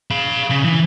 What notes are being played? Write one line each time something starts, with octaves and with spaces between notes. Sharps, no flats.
F5 B5
C#3
E3